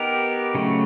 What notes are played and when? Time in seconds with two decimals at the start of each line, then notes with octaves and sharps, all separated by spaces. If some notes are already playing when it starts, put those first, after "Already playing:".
Already playing: B3 D#4 G4 A#4
0.55 C#3 F#3 A3